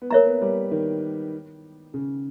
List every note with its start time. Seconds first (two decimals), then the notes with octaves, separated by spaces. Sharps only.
0.02 B3
0.11 A#3 A#4 C#5 E5 A#5
0.26 B3
0.42 G3
0.71 D#3
1.94 C#3